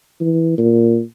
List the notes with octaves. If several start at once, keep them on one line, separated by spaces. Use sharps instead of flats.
E3
A#2